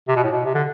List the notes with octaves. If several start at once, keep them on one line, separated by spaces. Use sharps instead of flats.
C3
B2
A2
B2
C3
D3